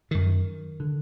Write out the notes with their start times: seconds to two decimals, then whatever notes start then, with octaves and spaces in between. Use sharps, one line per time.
0.11 F#2 D3 D#3
0.80 D3